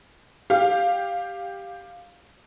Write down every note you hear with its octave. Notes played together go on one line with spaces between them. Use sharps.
G4 F5